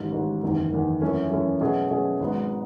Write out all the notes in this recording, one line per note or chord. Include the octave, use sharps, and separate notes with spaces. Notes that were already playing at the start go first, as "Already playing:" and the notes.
Already playing: A1 G#2 D#3
A1 G#2 D#3
F#1 E2 D#3
F#1 E2 D#3
F#2 E3 A3 C#4
F#2 E3 A3 C#4
B2 F#3 A3 C#4 G#4
B2 F#3 A3 C#4 G#4
G#1 G#2 F#3 B3